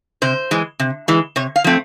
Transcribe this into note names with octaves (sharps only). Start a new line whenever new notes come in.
C3 C5
E3 G#3
C3
E3 G#3
C3 C#5
F5
F3 A3 C4